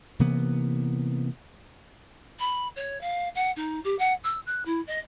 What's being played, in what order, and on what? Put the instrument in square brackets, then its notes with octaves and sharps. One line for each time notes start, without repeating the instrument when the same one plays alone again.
[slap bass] C3 E3 A#3 B3
[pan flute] B5
C#5
F5
F#5
D#4
G4
F#5
E6
F#6
E4
D#5